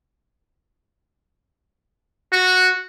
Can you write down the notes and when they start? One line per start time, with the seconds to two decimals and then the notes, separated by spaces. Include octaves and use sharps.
2.32 F#4